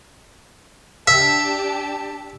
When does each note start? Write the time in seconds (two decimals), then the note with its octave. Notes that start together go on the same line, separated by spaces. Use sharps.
1.08 D4 G4 E5 A5